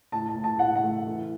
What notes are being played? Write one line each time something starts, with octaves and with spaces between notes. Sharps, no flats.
A2 A5
A5
A2
A5
A2 F#5
F#5
A3
E3